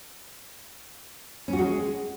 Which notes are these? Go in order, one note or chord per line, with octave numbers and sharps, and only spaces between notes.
C#4
F#4
G#3